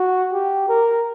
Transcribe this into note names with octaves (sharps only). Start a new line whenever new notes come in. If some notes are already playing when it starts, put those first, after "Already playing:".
Already playing: F#4
G4
A#4